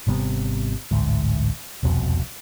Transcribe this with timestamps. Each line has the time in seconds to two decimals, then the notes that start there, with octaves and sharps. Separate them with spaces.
0.07 G#1 C3 G3 B3
0.91 A1 D2 G#2
1.83 E1 C2 F2 B2